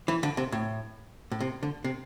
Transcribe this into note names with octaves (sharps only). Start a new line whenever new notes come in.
E3
D3
C3
A2
A2
C3
D3
C3